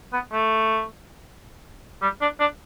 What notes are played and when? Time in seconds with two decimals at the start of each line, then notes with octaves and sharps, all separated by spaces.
0.13 B3
0.32 A3
2.02 G3
2.21 D4
2.40 D4